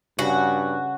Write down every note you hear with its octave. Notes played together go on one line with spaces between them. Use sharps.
G2 C#3 F#4